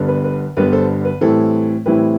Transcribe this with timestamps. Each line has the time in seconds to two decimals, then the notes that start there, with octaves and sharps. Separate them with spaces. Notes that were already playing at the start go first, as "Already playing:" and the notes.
Already playing: G1 G2 D3 G3 B3
0.08 B4
0.24 B4
0.57 G1 G2 D3 G3 B3 B4
0.72 A4 C5
1.05 B4
1.21 A2 E3 G3 C4 E4 A4
1.86 A2 E3 G3 C4 E4 B4